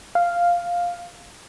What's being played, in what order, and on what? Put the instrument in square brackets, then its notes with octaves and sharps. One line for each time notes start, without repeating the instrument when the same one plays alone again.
[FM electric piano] F5